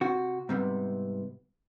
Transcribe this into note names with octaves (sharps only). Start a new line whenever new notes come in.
C3 F#4
G#2 C3 G3 B3